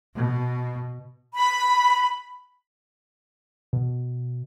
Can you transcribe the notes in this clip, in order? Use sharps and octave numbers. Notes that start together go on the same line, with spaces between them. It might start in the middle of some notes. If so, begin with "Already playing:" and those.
B2
B5
B2